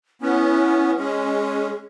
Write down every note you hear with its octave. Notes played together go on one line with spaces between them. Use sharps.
B3 C#4 E4
G#3 C#4 G#4